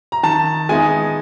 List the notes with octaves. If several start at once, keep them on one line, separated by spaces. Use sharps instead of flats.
A#5
D#3 A5
G#3 B3 D#4 G#5